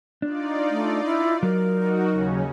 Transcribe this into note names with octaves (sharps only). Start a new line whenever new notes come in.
D4 D#4 F4 D5
A3
E4
F#3 A#4
D#4 F#4
D#2 C#3 C#4